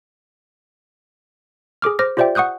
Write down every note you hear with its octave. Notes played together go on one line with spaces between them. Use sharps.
G#4 A4 D6 F6
C5 D6 F6 A#6
F4 G4 C5 D5 E5 G5
F#5 C#6 D#6 F#6 G6